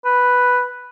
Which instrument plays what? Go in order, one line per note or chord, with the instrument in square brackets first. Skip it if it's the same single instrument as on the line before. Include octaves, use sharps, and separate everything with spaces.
[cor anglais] B4